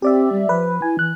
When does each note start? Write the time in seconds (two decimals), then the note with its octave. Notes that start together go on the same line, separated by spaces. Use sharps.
0.02 C4 G4 D5 E5
0.32 G3
0.49 F3 B4
0.82 E4 G#5
0.99 E3 F#6